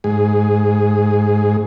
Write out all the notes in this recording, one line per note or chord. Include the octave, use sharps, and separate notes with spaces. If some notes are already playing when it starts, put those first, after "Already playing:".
G#2 G#4